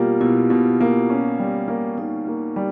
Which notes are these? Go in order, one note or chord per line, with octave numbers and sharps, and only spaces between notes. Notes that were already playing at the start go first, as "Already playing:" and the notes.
Already playing: B2 G3 A#3 F4 G4
B2 E4
B2
A#3
C#4
G3
A#3
A#3 D#4
A#3
G3